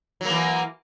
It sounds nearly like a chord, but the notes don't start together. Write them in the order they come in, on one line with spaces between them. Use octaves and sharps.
F#3 A#3 E3